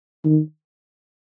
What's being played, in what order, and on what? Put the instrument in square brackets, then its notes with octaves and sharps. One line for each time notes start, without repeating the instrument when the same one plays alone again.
[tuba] D#3